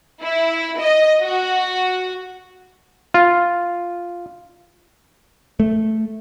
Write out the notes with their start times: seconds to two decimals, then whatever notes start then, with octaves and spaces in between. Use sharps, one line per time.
0.23 E4
0.80 D#5
1.22 F#4
3.14 F4
5.60 A3